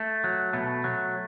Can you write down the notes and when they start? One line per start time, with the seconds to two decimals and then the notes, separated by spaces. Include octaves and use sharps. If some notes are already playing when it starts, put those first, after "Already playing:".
Already playing: A3
0.24 F#3
0.53 B2 A3
0.84 F#3